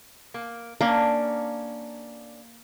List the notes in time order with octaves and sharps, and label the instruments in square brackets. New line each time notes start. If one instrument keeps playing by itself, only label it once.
[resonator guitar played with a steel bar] A#3
[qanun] A#3 [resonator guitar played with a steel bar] C#4 D4